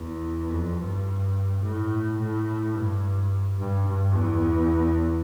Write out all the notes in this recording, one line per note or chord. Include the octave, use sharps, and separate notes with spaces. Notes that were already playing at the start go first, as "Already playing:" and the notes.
Already playing: E2
F2
G2
A2
A2
G2
G2
G2
E2